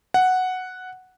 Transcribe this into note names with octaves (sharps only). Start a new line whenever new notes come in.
F#5